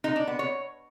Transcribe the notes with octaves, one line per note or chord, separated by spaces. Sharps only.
D#4
D4
B3
C#5